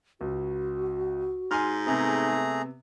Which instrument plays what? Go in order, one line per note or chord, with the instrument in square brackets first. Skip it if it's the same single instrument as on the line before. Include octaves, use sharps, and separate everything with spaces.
[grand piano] C#2 [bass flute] F#4
[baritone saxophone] G#2 [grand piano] G#5 C6 F6
[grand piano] C3 B3 [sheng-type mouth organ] A3 G#4 A#5